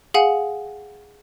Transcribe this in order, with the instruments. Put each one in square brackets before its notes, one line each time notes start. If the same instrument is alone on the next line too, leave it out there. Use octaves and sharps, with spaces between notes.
[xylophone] G#4 F5 F#5 G#5